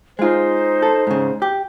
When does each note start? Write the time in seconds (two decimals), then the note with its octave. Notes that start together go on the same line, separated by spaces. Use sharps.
0.19 G#3 D#4 F4 C5
0.82 A4
1.07 G#2 C#3
1.42 G4